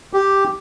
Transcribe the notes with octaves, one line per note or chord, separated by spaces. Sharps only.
G4